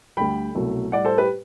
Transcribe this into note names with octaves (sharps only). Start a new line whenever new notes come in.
D2 D3 G3 G5 B5
C2 B2 F#3 A3
A2 G3 D5 F#5
A4 C5
G4 B4